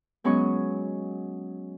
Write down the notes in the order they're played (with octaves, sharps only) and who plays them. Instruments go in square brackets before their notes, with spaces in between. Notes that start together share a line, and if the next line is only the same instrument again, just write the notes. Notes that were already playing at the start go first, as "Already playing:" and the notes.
[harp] F#3 G#3 B3 C#4 C#6